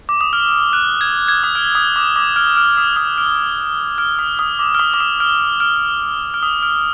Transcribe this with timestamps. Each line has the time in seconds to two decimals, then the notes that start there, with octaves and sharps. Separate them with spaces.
0.09 D6
0.21 D#6
0.33 F6
0.73 F#6
1.01 G#6
1.28 G#6
1.44 D#6
1.55 F6
1.75 D#6
1.96 D6
2.16 D6
2.36 F6
2.57 F6
2.77 D#6
2.96 D#6
3.18 F6
3.98 F6
4.19 D#6
4.39 D#6
4.59 D6
4.75 F6
4.80 D#6
4.94 D6
5.00 D#6
5.20 F6
5.60 F6
6.34 F6
6.43 D#6
6.63 F6